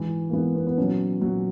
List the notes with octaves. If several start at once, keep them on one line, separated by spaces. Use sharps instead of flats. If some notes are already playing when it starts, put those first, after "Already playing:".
Already playing: G#2 E3
A#3
G#2 E3 B3
B3
B3
A#2 F#3 C#4
A#2 F#3